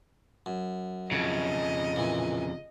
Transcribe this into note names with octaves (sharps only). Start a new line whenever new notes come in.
F#2
F2 C#3 D#5
A#2 E3